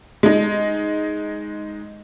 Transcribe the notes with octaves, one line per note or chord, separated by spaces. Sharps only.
G#3 D#4